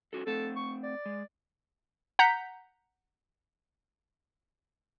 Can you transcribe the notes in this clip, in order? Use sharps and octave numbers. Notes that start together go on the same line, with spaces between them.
C#4 F#4 A4
A3 C4 A4
C#6
D5
G#3
F#5 A#5 G6 B6